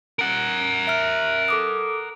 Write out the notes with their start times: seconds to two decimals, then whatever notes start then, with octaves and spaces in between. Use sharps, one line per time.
0.19 A#4 F#5
0.87 E5 F6
1.48 A4 D6 D#6